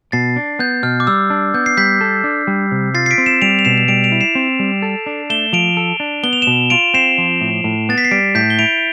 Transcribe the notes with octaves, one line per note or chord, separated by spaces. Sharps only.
B2 A6 C7
D4
B3 G6
B2 F6
D6
G3 E6
D4
B3 G6
C7
G3 G6 B6
A4
D4
G3
C3
F4 A6 C7
C7
B6 D7
C4
C7 E7
G3 D7 F7
F7
B2 C7 E7
E7
G3 D7 F7
D7 F7
E4
C7 E7
C4
G3
A4
D4
A3 E7 G7
F3 D7 F7
A4
D4
B3 G7
F7
E7 G7
B2
F4 D7 F7
C4 C7 E7
F3
A2
A2
B3 A6
B6
C7
G3 B6 D7
A2 G6 B6
G7
E4 D7 F7